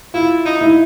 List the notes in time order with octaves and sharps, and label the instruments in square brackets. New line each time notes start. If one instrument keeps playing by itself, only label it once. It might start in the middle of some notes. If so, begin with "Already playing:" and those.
[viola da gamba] E4 [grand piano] F4
[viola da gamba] D#4
[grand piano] E4